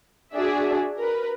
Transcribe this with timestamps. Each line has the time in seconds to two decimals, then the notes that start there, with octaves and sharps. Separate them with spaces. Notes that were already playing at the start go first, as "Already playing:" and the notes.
0.33 D4 F#4 G#4 D5 E5
0.97 A#4 B4